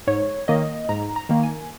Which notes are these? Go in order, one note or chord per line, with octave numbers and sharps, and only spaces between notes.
G#2 C#5
D#3 A#3 D#5
G#2 A#5
A#5
D#3 A#3
G#5